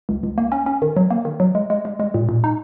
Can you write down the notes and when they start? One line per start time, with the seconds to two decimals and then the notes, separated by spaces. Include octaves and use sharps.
0.09 C#2
0.23 C#2
0.38 A#3
0.52 C#4
0.66 C#4
0.82 D#3
0.96 F#3
1.11 A#3
1.25 D#3
1.40 F#3
1.55 G#3
1.70 G#3
1.85 G#3
2.00 G#3
2.14 A#2
2.29 A#2
2.44 D#4